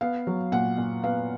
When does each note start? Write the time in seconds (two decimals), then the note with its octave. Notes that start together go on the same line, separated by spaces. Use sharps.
0.01 B3 F5
0.27 F#3
0.52 A#2 F#5
0.78 A#2
1.03 B3 F5